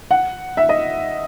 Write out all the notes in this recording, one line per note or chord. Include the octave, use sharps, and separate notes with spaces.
F#5
E5
D#5